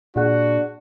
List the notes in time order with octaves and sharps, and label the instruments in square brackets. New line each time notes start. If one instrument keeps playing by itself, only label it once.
[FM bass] A#2 [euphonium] D4 [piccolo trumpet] F#4 [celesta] G#4 F#5 F#6